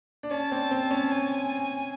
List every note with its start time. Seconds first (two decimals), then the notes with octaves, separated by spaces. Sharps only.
0.23 D4
0.31 C#4 A5
0.52 C4
0.71 C4
0.91 C#4
1.11 G#5